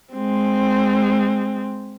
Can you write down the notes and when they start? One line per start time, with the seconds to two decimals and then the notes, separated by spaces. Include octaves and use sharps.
0.14 G#3 C4